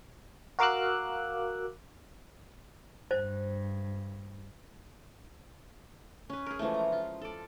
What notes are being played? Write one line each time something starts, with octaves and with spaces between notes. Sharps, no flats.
F#4 A#4 F5 D6 E6 F#6
G2 C5
C#4 B4
G#4 A#4
E3 F3 G#3 A3
A#5
F4
A4 D5